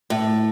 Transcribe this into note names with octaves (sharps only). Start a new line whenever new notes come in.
A2